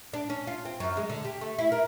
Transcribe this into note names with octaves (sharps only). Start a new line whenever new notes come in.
D4
C#4
F4
C4
F#2
G#3
D3
G4
A3
E4
A#4